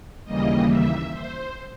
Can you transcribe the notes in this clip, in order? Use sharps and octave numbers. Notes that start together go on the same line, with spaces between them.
D#2 C#3 E3 G3 A#3 D#5
E5
C5